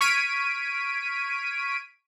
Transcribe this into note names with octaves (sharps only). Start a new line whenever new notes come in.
C#6 F6 G#6 B6 D7 D#7